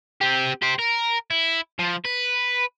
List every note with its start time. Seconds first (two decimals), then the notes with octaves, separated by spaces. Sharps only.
0.21 C4 G4
0.62 G4 C5
0.79 A#4
1.30 E4
1.79 F3
2.05 B4